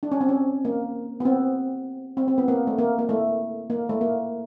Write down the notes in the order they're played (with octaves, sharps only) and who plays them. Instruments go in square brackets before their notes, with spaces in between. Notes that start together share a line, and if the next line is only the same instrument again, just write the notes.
[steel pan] D4
C#4
C4
C#4
A#3
B3
C4
C4
C4
B3
A#3
A3
A#3
A#3
A3
A#3
A3
A#3